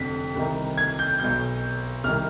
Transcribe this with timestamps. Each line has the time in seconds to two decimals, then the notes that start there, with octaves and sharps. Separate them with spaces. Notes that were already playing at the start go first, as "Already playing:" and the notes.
Already playing: F1 F2 D3 B6
0.35 C2 C3 D#3
0.78 G#6
0.99 G6
1.20 B1 B2 G6
2.04 C2 C3 D#3 F6